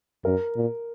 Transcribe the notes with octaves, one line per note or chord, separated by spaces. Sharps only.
F#2 A#4
A#2